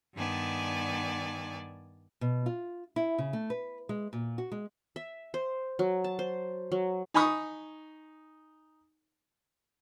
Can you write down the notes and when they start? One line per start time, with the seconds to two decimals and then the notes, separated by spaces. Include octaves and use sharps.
0.15 G2 D#3 B3 D5 G#5 A5
2.21 B2
2.46 F4
2.96 E4
3.18 C#3
3.33 A3
3.50 B4
3.89 G#3
4.13 A#2
4.38 F#4
4.52 G#3
4.96 E5
5.34 C5
5.79 F#3
6.04 A5
6.19 C5
6.72 F#3
7.14 D#4 G#5 B5 C#6 D#6